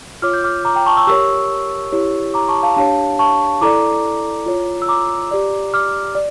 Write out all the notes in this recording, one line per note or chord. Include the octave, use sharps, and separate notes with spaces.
F4 C#5 D6 F6
G6
D6 F6
A#5 D6
G5 A#5
A5 C#6
C#6 E6
G4 A#4 C#5 C#6 E6
E4 G4 C#5
A#5 D6
A5 C#6
F5 A5
D4 G4 C#5 F5 A5
A5 C#6
E4 A4 D5 A#5 D6
F4 C#5
E6
A#5 D6
G4 D5
D6 F6
D5